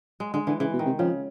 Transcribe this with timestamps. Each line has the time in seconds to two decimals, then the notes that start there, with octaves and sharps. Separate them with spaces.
0.20 G#3
0.34 D3 G#3
0.47 D3 E3
0.60 C#3 E3
0.73 B2
0.79 D#3
0.86 C3
0.99 C#3 F3